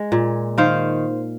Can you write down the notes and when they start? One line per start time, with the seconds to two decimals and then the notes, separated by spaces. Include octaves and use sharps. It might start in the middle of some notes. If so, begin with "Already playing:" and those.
Already playing: G#3
0.12 A#2
0.58 D#3 C5 F5